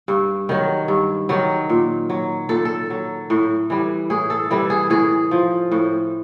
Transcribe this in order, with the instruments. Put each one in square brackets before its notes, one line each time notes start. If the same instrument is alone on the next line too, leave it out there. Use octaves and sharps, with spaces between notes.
[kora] G2
D#3 F#3
G2
D#3 F#3
A#2
F#3
A#2 A4
A4
F#3
A2
E3 G3
A2 G#4
A4
E3 G3 A4
G#4
A2 G#4
F3
A2